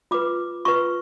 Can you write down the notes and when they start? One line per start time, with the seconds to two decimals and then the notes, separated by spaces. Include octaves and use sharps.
0.11 F4 B4 D6
0.65 F4 B4 C#6